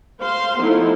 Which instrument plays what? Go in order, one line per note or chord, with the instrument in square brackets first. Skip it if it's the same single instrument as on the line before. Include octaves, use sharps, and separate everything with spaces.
[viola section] C5 F5 C6
F3 A3 B3 D#4 E4